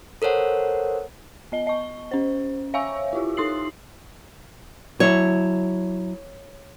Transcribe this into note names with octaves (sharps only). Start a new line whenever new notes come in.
A4 A#4 C5 C#5 F#5
B3 D#5 G7
D#5 C#6
C#4 C5
C#5 E5 F5 G#5 C#6 E6
E4 F4 G4
D#4 C6 D#6 C7 F#7
F#3 E4 C#5